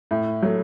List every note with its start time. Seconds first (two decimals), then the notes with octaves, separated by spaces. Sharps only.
0.11 A2
0.42 F#3 A3